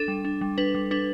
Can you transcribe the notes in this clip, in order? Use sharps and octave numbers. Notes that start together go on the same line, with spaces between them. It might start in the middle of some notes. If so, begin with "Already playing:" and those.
Already playing: D4 A4
G3
D4
G3
D4 B4
G3
D4 B4